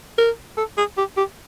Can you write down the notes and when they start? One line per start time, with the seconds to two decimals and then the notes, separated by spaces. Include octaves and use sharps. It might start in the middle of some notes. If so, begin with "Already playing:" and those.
0.18 A#4
0.57 A4
0.78 G#4
0.98 G4
1.17 G4